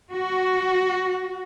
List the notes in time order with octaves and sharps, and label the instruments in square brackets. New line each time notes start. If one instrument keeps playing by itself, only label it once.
[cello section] F#4